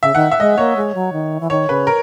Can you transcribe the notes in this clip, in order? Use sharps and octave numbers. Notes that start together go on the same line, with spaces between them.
C#3 E5
D#3 F#5
E5
G#3 D#5
A#3 C#5
G#3
F#3
D#3
E3
D#3 C#5
C#3 B4
A#4